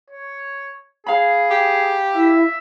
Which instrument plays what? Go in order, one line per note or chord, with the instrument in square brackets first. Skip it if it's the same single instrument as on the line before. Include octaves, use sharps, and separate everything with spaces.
[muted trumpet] C#5
[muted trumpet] G#4 [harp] F5 B5
[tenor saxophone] G4
[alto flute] E4 [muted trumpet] E5